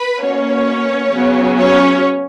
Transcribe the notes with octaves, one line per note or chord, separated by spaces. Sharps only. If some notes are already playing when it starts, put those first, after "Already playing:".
Already playing: B4 B5
B2 A#3 C#4 C#5
C#3 F#3 B3
C#4 C#5